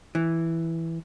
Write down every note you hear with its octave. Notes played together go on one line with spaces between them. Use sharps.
E3